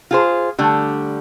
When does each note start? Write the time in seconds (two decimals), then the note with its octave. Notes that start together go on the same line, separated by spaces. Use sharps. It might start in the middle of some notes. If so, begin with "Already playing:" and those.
0.11 F4 G#4 C5
0.59 D3 G3 A3